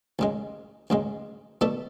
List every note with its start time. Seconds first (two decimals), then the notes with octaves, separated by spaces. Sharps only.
0.19 D2 C#3 G#3
0.90 D2 C#3 G#3
1.61 B2 A3 D4 A4